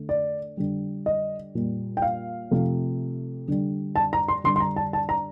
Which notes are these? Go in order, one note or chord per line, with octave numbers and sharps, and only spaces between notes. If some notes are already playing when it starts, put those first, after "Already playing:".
Already playing: D3 A3
D5
D3 G3
D#5
A#2 G3
G5
F5
C3 F3 A3
D3 G3
A5
A#5
C6
D3 G3 C6
C6
A#5
A5
A5
A#5